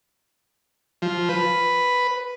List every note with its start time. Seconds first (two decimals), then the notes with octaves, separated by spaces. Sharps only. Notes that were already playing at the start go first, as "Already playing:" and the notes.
1.02 F3
1.29 B4